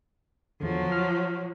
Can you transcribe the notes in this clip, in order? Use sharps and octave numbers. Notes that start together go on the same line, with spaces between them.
E2 D3 F3 F#3
F6